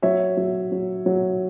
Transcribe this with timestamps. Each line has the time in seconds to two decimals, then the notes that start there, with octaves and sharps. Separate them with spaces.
0.02 F#3 C#5 E5
0.37 F#3
0.72 F#3
1.06 F#3